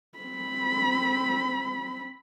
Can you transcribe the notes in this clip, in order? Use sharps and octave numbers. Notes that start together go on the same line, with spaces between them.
C4 B5